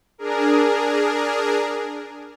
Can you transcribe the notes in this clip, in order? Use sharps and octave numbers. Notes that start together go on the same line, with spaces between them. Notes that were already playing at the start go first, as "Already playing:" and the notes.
D4 G#4 A#4